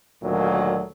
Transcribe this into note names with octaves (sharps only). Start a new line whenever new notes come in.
D2 A#2 D#3 F#3